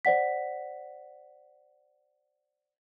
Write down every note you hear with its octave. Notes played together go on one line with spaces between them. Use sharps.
C5 D5 F#5 B6